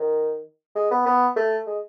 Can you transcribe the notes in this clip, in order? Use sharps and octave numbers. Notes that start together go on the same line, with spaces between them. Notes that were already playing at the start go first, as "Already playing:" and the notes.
Already playing: D#3
G#3
B3
B3
A3
G#3